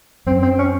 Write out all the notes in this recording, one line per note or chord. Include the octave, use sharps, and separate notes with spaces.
F#2 C4
C4
C#4